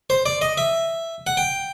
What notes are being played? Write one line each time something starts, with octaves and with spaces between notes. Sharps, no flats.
C5
D5
D#5
E5
F#5
G5